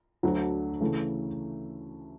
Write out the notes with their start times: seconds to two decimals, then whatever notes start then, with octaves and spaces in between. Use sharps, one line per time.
0.23 D2 D3 F#3 A3
0.81 C#3 E3 A3